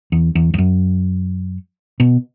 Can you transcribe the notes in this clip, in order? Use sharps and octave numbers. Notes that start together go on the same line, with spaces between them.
E2
E2
E2
F#2
B2